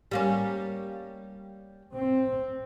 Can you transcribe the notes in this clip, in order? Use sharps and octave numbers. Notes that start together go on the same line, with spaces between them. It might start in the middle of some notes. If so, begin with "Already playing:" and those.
G3 A#3 C#4
C4